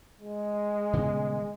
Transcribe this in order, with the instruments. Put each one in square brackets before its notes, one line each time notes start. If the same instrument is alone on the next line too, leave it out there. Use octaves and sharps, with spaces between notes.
[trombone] G#3
[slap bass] D#1 C#3 B3